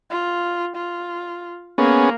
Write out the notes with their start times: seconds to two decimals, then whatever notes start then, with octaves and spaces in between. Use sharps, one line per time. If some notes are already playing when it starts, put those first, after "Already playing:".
0.10 F4
0.76 F4
1.78 A#3 B3 C#4 G#4